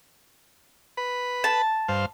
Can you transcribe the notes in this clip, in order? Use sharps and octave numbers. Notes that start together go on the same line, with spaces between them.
B4 B5
A5
G2 C5 F5